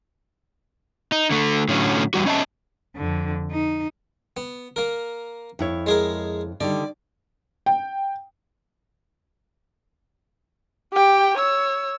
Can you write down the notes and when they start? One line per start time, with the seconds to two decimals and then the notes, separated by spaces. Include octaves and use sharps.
1.12 D#4
1.31 D3 A3
1.69 A2 D3 F#3 C#4
2.14 E2 G3 F#4
2.26 C#4 D#5 E5 A5
2.96 F2 D3
3.52 D#4
4.37 B3
4.76 A#3 A#4
5.59 F2 E4 C#5
5.86 G#3 G#4 A#4
6.60 D3 D#3 G3 D5
7.66 G5
10.93 G4 G5
11.38 C#5 E6